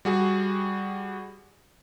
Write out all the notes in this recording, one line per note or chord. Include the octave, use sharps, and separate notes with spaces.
G3 F#4 G#4